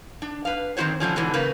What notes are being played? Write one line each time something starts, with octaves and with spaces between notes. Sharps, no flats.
D4
B4 F5
D3 D#3 C4 F#4 C5 C#5
A2 D3 F3 C#4
G#2 B2 D3 E3
C#3 A#3 B4